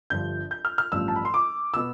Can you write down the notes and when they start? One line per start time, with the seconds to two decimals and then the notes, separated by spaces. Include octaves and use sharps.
0.10 G1 G2 F3 G6
0.51 G6
0.65 F6
0.78 F6
0.92 A1 G2 F3 E6
1.08 A5
1.16 B5
1.25 C6
1.34 D6
1.74 B2 B3 E6